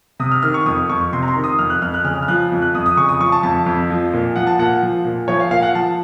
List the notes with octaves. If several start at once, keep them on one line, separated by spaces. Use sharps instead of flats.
C3 D#6
F6
D#3 F6
C#6
F2 D#6
F2 C#6
C3 C6
A#5
C6
D#3
D#6
F2 F6
F#6
F2 F6
F#6
C#3 F6
F6
F3 F#6
F2
F#6
F2 D#6
D#6
C#3 C#6
D#6
F3 C#6
A5
F2 A5
F2
F3
A#2
F3 F#5
A5
A#2 F#5
F3
A#2
F3 C#5
F5
A#2 F5
F#5
F3 A5